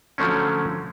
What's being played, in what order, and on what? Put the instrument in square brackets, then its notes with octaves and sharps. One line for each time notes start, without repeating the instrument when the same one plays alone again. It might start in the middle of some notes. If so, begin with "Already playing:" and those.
[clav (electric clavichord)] D3 F3 F#3 A3 C4 C#4